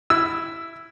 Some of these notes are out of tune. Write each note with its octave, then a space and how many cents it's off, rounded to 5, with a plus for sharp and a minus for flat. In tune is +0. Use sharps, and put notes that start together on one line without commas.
E4 +5 E6 +0